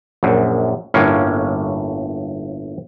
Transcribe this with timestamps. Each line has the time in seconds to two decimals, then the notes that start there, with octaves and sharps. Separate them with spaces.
0.23 A#1 F#2
0.94 G1 A2 A#3 C#4